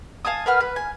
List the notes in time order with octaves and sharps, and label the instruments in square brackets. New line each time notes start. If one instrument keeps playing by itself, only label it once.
[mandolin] F5 G#5 A5 D#6
A#4 B4 F#5 F6
B4 B5
G#5